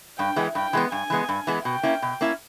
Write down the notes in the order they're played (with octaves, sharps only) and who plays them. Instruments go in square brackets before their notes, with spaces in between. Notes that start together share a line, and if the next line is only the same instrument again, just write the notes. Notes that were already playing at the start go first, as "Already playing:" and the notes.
[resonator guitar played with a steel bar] G2 [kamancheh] G5
[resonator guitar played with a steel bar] E3 G#3 B3
[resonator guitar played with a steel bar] G2 [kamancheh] G5
[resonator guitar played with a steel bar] E3 G#3 B3
[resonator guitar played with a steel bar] G2 [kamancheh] G#5
[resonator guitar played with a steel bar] E3 G#3 B3
G2
E3 G#3 B3
[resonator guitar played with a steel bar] B2 [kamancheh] G5
[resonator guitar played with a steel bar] A#3 C#4 E4
B2
A#3 C#4 E4